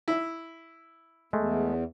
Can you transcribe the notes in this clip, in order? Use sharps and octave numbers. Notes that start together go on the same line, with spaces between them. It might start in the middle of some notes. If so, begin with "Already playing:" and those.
E4
E2 G#3 A3